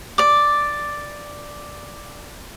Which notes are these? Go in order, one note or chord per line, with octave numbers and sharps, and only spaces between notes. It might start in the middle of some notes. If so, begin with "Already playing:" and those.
D5 D6